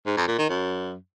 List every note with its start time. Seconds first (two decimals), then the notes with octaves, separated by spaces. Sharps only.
0.06 G#2
0.17 F2
0.28 A#2
0.39 D#3
0.49 F#2